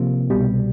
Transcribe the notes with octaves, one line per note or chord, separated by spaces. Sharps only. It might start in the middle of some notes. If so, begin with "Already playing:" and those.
Already playing: C3 F3 A#3
C2 B2 G3